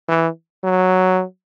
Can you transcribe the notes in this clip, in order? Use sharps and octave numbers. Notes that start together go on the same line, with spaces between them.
E3
F#3